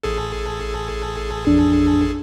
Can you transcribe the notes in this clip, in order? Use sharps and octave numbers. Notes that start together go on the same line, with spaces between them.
A1 G#4 A4
F2 D4